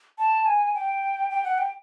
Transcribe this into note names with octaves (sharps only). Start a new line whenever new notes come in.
A5
G#5
G5
G5
F#5
G5